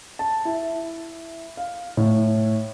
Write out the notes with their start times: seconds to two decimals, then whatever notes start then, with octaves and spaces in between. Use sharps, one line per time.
0.19 A5
0.45 E4
1.57 F5
1.97 A2